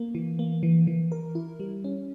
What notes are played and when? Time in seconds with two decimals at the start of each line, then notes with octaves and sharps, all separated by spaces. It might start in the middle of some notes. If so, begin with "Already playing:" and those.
Already playing: A#3
0.15 E3
0.39 A#3
0.63 E3
0.87 E3
1.12 A#4
1.35 E4
1.60 G3
1.84 C#4